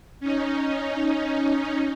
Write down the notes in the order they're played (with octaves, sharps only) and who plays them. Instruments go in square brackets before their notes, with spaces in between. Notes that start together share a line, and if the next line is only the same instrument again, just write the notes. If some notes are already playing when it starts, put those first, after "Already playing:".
[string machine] C#4 D#4